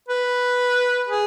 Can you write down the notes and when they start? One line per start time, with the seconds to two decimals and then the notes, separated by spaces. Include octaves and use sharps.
0.09 B4
1.09 G#4